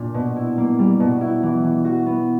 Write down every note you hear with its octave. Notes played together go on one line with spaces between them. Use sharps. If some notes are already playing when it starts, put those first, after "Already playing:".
Already playing: A#2 D4
B2
E4
A#3
G3
B2
E4
E3
E3
F#4
B3